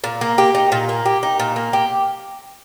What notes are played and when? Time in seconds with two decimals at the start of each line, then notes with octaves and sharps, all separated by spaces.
0.04 A#2
0.21 A#3
0.38 G4
0.55 D#4
0.72 A#2
0.89 A#3
1.06 G4
1.23 D#4
1.40 A#2
1.56 A#3
1.73 G4